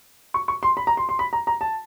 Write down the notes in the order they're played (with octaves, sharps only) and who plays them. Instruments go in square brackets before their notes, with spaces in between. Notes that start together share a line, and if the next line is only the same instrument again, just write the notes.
[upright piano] C#6
C#6
C6
B5
A#5
C6
C6
B5
A#5
A#5
A5